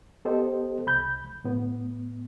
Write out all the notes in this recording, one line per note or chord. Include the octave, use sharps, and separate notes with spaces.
B3 G4 A4 C5 D#5
C2 B5 G6
A2 B3